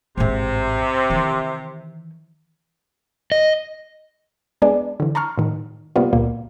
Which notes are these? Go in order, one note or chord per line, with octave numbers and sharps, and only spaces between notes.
A1 G#2 C3
D#3 E3
D#5
G#3 B3 D4 G#4 D5
D3 E3
A5 A#5 C6 C#6 F6
A2 D#3
C3 G3 A#3 B3 F4
C#2 A#2 A#3